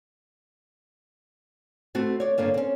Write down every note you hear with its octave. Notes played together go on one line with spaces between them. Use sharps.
A3 B3 C4 F#4
C#5 D5
G2 D3 A#3 C#5
C4 C#4